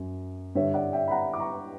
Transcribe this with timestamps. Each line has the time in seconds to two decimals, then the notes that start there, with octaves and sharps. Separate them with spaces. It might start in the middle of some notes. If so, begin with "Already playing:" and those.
Already playing: F#2
0.55 G2 D3 C#5 E5
0.74 D5 F#5
0.93 E5 G5
1.08 B5
1.11 F#5 A#5
1.34 D6
1.40 A#5 C#6